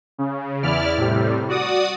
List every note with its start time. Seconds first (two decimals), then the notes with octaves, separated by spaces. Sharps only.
0.18 C#3
0.63 E2 E4 D5 F6
0.97 A2 C3 G3
1.48 F#4 D5 D#6